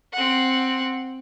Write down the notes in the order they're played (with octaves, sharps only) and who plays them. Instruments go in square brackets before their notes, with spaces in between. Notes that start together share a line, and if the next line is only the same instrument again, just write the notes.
[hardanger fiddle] C4 F#5